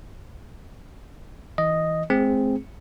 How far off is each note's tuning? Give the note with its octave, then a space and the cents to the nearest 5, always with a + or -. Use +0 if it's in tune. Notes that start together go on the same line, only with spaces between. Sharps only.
E3 -20 D#5 +0
G#3 +40 C4 +0 G#4 -5